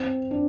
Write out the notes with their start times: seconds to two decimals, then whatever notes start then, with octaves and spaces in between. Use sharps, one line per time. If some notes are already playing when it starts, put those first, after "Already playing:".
Already playing: C4
0.31 D4